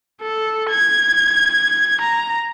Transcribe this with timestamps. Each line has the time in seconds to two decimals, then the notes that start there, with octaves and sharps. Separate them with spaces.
0.22 A4
0.70 G#6
2.01 A#5